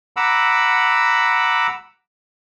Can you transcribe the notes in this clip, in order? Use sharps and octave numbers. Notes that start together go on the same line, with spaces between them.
F#5 A#5 B5 D6 E6